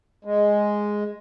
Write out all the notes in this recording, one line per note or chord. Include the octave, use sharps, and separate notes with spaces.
G#3